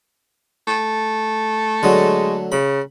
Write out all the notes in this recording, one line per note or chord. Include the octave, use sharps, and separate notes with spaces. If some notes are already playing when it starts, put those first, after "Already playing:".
A3
D3 F#3 G#3
C#3 B5